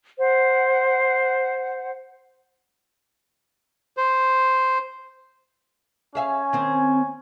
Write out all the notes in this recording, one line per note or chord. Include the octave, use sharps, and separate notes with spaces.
C5 F#5
C5
C#4 G#4 E5 F5 G#5
D#3 C4